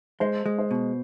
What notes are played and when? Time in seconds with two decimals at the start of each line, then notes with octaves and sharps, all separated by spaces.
0.20 G#3 C5
0.46 G#3
0.58 C5
0.71 B2